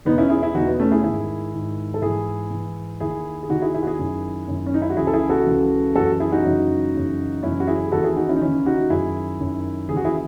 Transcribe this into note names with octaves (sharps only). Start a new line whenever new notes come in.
E2 B2 B3 D#4
C#4 E4
E4 G#4
E4 G#4
E2 B2 D#4 F#4
B3
A3 C#4
E4 G#4
G#2 D#3 E4 G#4
G#2 D#3
A4
G#2 E3 E4 G#4
G#2 E3
D#2 D#3 E4 G#4
G#4
D#2 D#3 D#4 F#4
E4 G#4
E4 G#4
F#4
E4 G#4
F#2 D#3
F#2 D#3
C#4
D#4
E4
F#4
C#2 C#3 E3 E4 G#4
A4
E4 G#4
F#4 A4
C#2 C#3 E3
F#2 C#3 E3 F#4 A4
E4 G#4
D#4 F#4
F#2 C#3 E3
F#2 C#3 E3
F#2 C#3 E3 C#4 E4
F#4
E4 G#4
G#4
D#2 C#3 E3 F#4 A4
E4 G#4
D#4 F#4
C#4 E4
D#4
D#2 C#3 E3 C#4 E4
D#4 F#4
F#2 D#3 E4 G#4
F#2 D#3
D#2 C#3 E3 G#4
F#4
E4 G#4